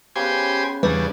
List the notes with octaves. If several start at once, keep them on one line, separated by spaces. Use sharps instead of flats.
C#3 B3 G4 C5 G#5
E2 C#3 G3 D4 B4